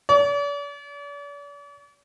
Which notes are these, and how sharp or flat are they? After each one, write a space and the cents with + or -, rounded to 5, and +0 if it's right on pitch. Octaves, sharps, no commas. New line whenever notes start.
D5 -45